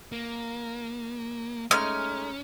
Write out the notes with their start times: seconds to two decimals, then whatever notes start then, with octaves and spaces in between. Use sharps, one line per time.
0.12 A#3
1.71 G#3 A3 C#4 D#4 F6